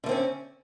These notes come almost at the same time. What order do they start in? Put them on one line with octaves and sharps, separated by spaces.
D3 A3 C4 C#4